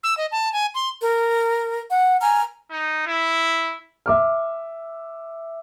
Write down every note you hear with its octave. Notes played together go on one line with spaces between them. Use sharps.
E6
D#5
A5
G#5
C6
A#4
F#5
G#5 A#5 F6
D#4
E4
E5 D6 F6